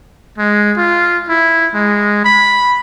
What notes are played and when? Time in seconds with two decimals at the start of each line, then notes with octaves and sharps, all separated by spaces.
0.38 G#3
0.77 F4
1.29 E4
1.74 G#3
2.24 B5